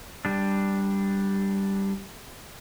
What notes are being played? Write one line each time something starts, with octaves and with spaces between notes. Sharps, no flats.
G3 D4